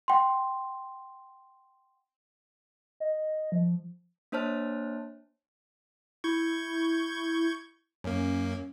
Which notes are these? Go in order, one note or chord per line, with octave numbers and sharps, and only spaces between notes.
F#5 G5 C6
D#5
F3
A#3 D4 C5 C#5 A5 F6
E4 C#6 G6 G#6
F#2 A#3 C#4